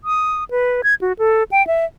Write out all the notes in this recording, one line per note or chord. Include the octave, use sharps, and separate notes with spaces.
D#6
B4
G#6
F#4
A4
G5
E5